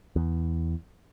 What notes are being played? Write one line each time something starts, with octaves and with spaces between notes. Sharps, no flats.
E2